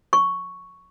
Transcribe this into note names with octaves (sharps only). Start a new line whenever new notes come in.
C#6